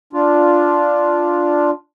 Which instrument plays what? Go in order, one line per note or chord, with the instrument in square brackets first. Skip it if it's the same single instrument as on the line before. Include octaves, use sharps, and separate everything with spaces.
[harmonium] D4 F4